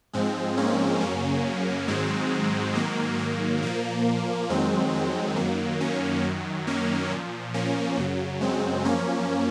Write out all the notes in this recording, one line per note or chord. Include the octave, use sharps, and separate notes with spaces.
G#2 F3 G#3 C4
A#3 C#4
F#2 C#3 F#3 A#3 C#4
G#2 D#3 F#3 G#3 C4
G#2 D#3 F#3 A#3
A#3
A#2 F3 A#3
F2 D#3 F#3 G#3 C4
G#3
F#2 D#3 F#3 A#3
A#3 C#4
F#2 D#3 F#3
A#3 C#4
A#2 F3
A#3 C#4
F#2 C#3 F#3
G#3 C4
F#2 F3 A#3 C#4